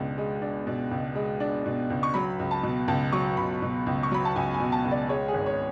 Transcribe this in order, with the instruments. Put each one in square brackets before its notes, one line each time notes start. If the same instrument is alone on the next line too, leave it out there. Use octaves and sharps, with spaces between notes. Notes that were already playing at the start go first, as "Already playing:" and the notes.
Already playing: [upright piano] C#2 B2 G#3 D4
G#3
D4
B2
C#2
G#3
D4
B2
C#2
C#6
F#3 B5
C#2
A5
B2
C#2 A5
F#3 C#6
C#2 B5
B2
C#2
C#6
F#3 B5
A5
C#2 G#5
G#5
B2
A5
C#2
D5
G#3 C#5
G#4
G#1
C#5